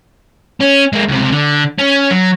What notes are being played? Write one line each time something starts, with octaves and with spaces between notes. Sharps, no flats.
C#4
G#3 A#3
C#2 C3
D3
C#4
F#3